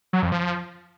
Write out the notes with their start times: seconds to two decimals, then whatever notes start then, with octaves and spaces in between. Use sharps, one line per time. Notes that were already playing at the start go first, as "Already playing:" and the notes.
0.13 F#3
0.22 F2
0.32 F3